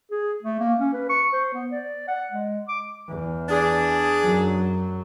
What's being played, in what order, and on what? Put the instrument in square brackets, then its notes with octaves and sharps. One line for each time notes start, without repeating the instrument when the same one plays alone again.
[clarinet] G#4
A3
A#3
C#4
B4
C#6
C5
B3
D5
F#5
G#3
D6
[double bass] E2
[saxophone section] D4 G#4
[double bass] F#2 F#3